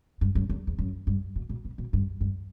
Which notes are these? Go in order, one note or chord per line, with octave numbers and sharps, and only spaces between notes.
G2
F#2
E2
E2
F#2
G2
B2
B2
B2
B2
G2
G2